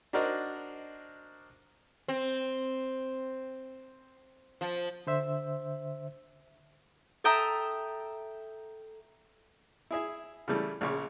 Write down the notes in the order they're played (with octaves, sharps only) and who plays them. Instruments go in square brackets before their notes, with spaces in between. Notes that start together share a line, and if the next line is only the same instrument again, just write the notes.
[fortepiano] D4 F#4 A#4 C5 D5 D#5
[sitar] C4
F3
[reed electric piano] D3 C5 E5
[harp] A4 E5 G5 A#5 D#6
[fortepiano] E4 G#4 E5
C#3 E3 G3 A3
A#1 C#3 C#6